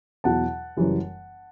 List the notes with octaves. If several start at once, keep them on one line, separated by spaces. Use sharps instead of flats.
E2 B2 F#3 F#5 A5
F#1 F#2 E3 G3